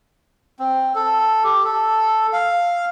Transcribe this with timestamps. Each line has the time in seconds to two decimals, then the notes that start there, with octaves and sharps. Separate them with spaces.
0.59 C4
0.95 A4
1.44 G4
1.64 A4
2.33 F5